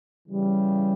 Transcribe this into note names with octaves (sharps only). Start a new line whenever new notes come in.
C#3 E3 G3